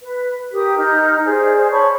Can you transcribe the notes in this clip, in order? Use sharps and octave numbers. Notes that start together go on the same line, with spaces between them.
B4
G4 A#4 D#6
D#4 A#5 F6 G6
G#4 C5 D5
C#5 A5 B5 C#6